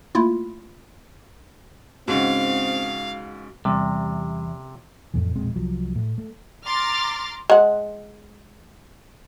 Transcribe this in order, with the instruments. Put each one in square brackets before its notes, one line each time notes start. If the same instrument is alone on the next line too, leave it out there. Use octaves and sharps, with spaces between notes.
[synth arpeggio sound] A3 A#3 E4 F4
[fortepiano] G#2 C#3 [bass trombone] C4 [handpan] F#4 [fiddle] F5
[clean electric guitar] E2 [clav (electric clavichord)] C3 [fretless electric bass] G3
[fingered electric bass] F2 A2 E3
E1 A#1 G#3 C4
C2 F3 F#3
A2
A3
[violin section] A#5 C6 D6 F6 A6
[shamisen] G#3 F#5